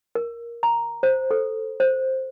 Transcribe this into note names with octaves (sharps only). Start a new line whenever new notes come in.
A#4
A#5
C5
A4
C5